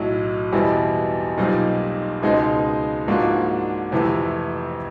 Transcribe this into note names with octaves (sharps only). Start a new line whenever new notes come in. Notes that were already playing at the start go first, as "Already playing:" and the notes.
Already playing: B1 A2 F#3
E2 B2 G3 C4 E4
B1 A#2 G3 C4 D#4
C#2 B2 G#3 C4 D#4
G#2 F3 A#3 D4 F#4
F2 C3 E3 A3